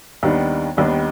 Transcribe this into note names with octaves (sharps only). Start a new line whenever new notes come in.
D#2 D#3 G3 B3 D4
D#2 D#3 G3 B3 D4